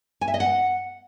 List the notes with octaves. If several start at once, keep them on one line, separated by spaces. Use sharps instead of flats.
G#5
E5
D#5
F#5